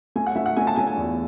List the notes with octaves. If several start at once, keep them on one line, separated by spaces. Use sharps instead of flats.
A3 G#5
F#5
A3 E5
F#5
A3 G#5
A5
A3 G#5
G#5
E2